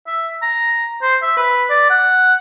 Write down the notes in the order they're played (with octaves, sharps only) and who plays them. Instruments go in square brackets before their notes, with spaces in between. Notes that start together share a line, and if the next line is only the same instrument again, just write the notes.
[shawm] E5
A#5
C5
E5
B4
D5
F#5